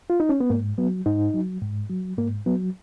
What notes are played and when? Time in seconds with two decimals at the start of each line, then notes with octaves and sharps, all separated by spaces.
0.10 F4
0.20 D#4
0.29 C#4
0.41 B3
0.50 G#2 A#3
0.78 F#3 B3
1.06 G#2 D#4
1.34 F#3
1.62 G#2
1.90 F#3
2.18 G#2 A#3
2.46 F#3 B3